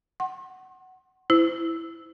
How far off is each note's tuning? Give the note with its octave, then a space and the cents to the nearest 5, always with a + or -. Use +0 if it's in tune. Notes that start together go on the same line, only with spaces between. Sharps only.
F#5 +15 C6 +35
E4 +5 C5 -30